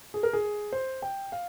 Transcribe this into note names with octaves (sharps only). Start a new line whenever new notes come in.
G#4
A#4
G#4
C5
G5
F5